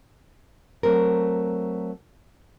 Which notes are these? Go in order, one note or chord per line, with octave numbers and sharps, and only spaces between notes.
F#3 A3 C4 A#4